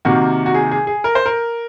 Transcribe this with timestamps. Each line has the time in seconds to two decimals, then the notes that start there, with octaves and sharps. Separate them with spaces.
0.05 C3 D#3 A#3 F#4
0.46 F#4
0.54 G#4
0.71 G#4
0.87 G#4
1.04 A#4
1.15 C5
1.26 A#4